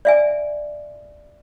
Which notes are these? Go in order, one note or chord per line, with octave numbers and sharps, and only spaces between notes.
D5 E5 G#5